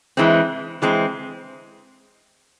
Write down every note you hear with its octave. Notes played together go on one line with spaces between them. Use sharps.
E3 G#3 C4
E3 G#3 C4